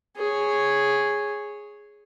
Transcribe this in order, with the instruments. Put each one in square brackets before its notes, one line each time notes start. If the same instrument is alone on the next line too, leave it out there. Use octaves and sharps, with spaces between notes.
[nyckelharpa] G#4 C#5